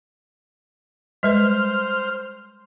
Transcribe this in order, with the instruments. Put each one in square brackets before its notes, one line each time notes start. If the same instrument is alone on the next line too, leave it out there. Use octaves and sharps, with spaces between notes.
[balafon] G3 G#3 B4 [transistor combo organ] C5 F6